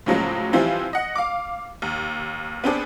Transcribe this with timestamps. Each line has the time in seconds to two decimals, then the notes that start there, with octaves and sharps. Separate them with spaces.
0.06 A2 C#3 F3 F#3 G#3 A#3
0.53 E3 F3 G3 C4 E4 F4
0.93 D#5 F#5
1.15 F5 D6
1.82 D#2
2.64 B3 C4 D4 G#4